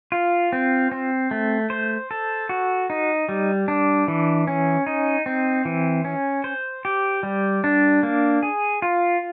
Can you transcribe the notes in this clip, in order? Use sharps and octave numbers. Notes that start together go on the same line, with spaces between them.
F4
C4
C4
A3
C5
A4
F#4
D#4
G3
D4
E3
C#4
D#4
C4
E3
C#4
C5
G4
G3
D4
A#3
G#4
F4